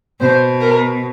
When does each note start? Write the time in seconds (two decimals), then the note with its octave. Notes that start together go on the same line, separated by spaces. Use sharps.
0.21 B2 C5
0.61 A#4